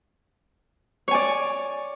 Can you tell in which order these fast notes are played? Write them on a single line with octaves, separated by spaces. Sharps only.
C#5 G#5 D5